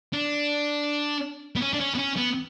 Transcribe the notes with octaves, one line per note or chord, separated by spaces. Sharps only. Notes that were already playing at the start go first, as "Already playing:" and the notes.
D4
B3
C#4
D4
C#4
B3
C#4
B3